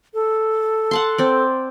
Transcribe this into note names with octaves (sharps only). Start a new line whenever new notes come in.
A4
F#5 A5 C6
C4 D5